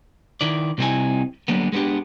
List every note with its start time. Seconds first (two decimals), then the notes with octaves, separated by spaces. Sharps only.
0.41 D#3 E4 D5
0.78 C2 C3 C4 D#4 E4 G#5
1.48 D3 F#3 G3 A#3 B3
1.72 G#3 B3 C4 D4 G4